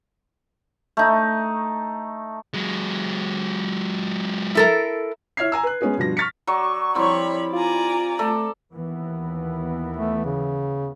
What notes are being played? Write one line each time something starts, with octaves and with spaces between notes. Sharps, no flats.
A3 D#4
F#3 G#3
E4 A4 A#4
E4 C#5 E5 F6 G#6 C7
G#5 A#5 E6
B4 F#6
G#3 B3 C#4 G#4 B4
G2 B2 F3 A#6
C#6 F6 A6 B6 C#7
F#3 D5 C#6
F3 G3 C4 E4 C#5 B5
F4 D5 G#5 A#5
A3 A4 D5 A#5
D#2 E3 B3
A3
C#3